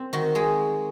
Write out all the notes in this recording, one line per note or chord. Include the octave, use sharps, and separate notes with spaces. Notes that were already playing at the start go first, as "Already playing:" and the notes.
Already playing: C4
D#3 F#4
G#3 G#4